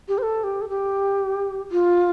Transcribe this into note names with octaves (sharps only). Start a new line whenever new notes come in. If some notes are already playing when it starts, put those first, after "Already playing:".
G4
C5
A4
G4
A4
G4
F4